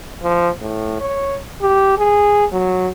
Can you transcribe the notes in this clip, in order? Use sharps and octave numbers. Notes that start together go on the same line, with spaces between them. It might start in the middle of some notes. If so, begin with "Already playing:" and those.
F3
A2
C#5
G4
G#4
F#3